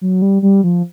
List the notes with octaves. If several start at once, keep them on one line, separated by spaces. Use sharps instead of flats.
F#3
G3
G3
F3